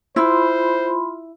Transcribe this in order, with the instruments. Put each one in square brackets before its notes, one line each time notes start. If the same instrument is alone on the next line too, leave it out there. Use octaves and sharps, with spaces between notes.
[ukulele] E4 [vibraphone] F4 B5 C6 [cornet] C5